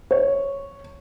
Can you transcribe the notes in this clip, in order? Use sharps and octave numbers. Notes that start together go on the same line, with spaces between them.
C#5